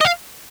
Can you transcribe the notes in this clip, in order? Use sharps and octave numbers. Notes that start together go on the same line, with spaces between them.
D#5
F5